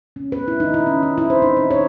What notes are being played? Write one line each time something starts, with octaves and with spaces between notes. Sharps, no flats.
C#4
B4
E4
D#4
E4
C#4
E4
E4
C5
D#4
D#4
C#5